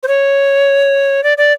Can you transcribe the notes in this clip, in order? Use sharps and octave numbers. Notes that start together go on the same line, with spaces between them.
C5
C#5
D5
D5